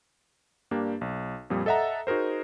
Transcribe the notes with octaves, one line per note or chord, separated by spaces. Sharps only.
G2 A#3 D4 G4
B1
F2 A#2 G3 D#6
A4 D#5 E5 F#5 A#5
D#4 F#4 G#4 A#4 C5